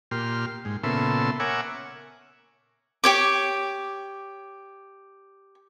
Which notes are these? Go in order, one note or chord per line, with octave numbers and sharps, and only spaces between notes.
A#2 G4 C6 F6
G#2
A#2 C#3 B3 A4 E5 C6
A#4 C#5 E5 F#5 G#5 D6
G4 C#5 D6